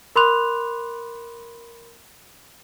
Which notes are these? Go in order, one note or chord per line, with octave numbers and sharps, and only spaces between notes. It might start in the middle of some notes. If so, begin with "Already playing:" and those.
A#4 B5 C6 D6 F#6 F7